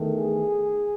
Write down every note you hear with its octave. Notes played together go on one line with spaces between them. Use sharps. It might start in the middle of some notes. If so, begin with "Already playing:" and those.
Already playing: E2 D#3 A3
G#4